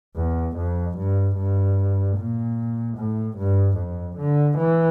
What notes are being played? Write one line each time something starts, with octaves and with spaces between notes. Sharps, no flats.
E2
F2
G2
G2
A#2
A2
G2
F2
D3
E3